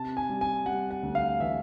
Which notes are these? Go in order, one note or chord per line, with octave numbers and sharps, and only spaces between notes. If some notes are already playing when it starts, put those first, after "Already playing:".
Already playing: C3 A5
G#5
G3
G#5
G3 F#5
F#5
D2
F5
E3 E5